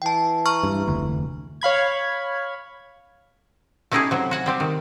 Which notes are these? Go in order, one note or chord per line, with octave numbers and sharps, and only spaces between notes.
E3 G5 A5
A#5 C#6 F6
G2
F1 D2
C#5 F5 B5 G#6
A3 C#4 D#4 E4 G4 G#4
C3 F#3
F#4 F#5 G#5
G3 C4 G4
D#3